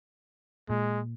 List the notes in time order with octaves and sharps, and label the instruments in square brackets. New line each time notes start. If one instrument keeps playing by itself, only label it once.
[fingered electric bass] A#2 [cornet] G#3